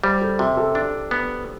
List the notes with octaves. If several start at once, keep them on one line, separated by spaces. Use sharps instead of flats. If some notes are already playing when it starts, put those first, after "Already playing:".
G3 C5
A4
C3 G4
A4
D4
B3